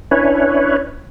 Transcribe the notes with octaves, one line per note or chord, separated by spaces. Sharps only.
C#4 D4 E4 B4 C#5